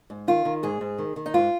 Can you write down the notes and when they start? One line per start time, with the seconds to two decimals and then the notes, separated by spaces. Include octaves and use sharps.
0.10 G#2
0.28 D#3 F4
0.45 D#3
0.63 G#2 G#4
0.81 G#2
0.98 D#3
1.16 D#3
1.26 D#4
1.34 G#2 F4